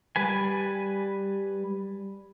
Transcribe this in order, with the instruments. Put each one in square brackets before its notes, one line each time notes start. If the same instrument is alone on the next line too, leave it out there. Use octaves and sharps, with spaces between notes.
[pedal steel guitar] G3 B4 G#5